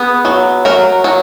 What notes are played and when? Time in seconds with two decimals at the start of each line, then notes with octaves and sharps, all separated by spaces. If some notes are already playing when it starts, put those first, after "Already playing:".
Already playing: B3 G#4
0.25 F#3
0.65 F#3 A#4
1.04 F#3